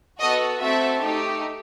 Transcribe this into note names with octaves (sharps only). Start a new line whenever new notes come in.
B3 F#4 A4 D#5
A3 C4 F#4 A4 E5
A3 D#4 G4